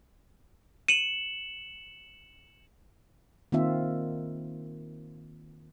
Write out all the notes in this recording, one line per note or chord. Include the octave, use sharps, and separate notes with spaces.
C#7 D#7 E7 F#7
D#3 A#3 C4 F4 E5